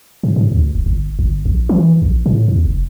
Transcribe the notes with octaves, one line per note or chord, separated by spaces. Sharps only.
G#2
G#2
D2
D1
G1
G1
A#1
E3
A#1
A2
E2
F1